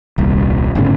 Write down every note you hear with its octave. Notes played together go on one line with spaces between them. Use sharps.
D#1 C2
G1 A2 C#3